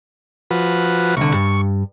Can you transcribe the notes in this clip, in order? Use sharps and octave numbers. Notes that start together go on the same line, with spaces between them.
F3 F#4 B4
C2 D3 C#6
G2